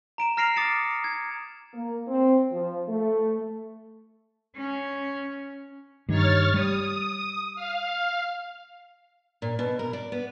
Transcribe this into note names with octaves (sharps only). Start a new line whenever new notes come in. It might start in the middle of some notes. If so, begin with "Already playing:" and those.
A#5 D7 E7
A#5 F6 A#6 C7 D7 F7
D6 D#6 A6 C#7 E7
G#6
A#3
C4
F3
A3
C#4
G2 D#3 C#5 F6 A6
G3 D#6
F5
A#2
B2
A#4
D5
B3